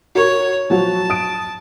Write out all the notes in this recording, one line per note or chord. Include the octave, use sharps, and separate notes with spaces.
F#4 A#4 C#5
F3 F#3 F#4 A5
D#6 D7